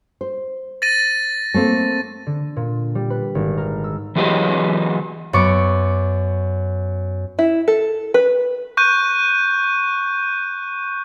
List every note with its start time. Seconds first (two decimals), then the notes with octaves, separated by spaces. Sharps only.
0.21 C5
0.82 A6 A#6 D#7
1.54 A3 A#3 C4
2.26 D3
2.56 A#2
2.95 G3
3.10 B4
3.35 G#1
3.57 A#4
3.84 E6
4.16 E3 F#3 G4 G#4 B4 D#5
5.33 F#2 B3 C#6 D6
7.39 E4
7.68 A4
8.14 B4
8.77 C#6 F#6 G6 D#7